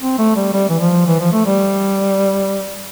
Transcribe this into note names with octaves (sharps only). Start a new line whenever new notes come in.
C4
A3
G3
G3
E3
F3
E3
F3
A3
G3